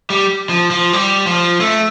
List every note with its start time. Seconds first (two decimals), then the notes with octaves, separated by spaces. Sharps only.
0.10 G3
0.50 F3
0.71 F3
0.93 G3
1.27 F3
1.61 A3